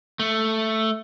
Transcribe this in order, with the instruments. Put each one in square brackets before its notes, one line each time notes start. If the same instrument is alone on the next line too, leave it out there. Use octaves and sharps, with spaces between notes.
[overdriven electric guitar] A3